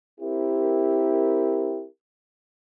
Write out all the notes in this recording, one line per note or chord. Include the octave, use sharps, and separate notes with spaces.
C4 E4 G4 A#4